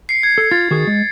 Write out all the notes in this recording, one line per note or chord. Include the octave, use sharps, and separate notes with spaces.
C7 C#7
G#6
A4
F4 A6
D#3 F#4 G#4
G#3